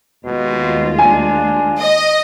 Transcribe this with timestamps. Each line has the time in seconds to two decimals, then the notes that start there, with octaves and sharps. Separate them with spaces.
0.25 D#2 B2 G#3 F4
0.99 D4 G#5
1.80 D#5